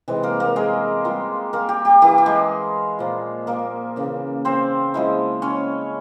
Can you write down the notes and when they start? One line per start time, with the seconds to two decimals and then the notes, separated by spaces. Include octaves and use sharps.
0.08 C3 E3 G#3
0.23 A#3 A#4
0.40 A#3 A#4
0.56 G#3 G#4
1.05 G3 A#3 F4
1.53 A#3 A#4
1.69 G4
1.85 G4
2.02 E3 A#3 E4 G4
2.18 G4
2.26 G#3 G#4
2.99 A#2 F3 A#3 F4
3.47 A#3 A#4
3.96 C#3 E3 A#3
4.45 C4 C5
4.94 F3 G#3 E4
5.42 C#4 C#5